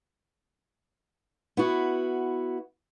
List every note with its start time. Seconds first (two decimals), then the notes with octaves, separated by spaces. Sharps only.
1.57 B3 E4 F#4